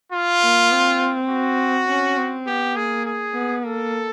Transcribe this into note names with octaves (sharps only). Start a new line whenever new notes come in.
F4
A#3
C4
F#4
C#4
C4
B3 G4
A#3 G#4
G#4
B3
A#3 A4